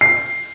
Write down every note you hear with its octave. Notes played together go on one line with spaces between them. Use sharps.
C7